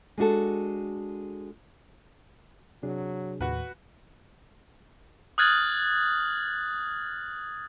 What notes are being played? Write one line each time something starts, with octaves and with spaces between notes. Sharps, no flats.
G#3 D4 F#4 A4
C3 F#3 D4 G#4
D#2 A2 F#4 B4
D#6 F6 F#6 G#6 A6 F#7